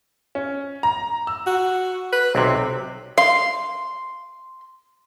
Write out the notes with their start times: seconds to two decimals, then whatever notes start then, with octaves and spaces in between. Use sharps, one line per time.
0.35 C#4
0.83 A#5
1.27 E6
1.47 F#4
2.12 B4
2.35 B1 C3 C4
3.18 F5 C6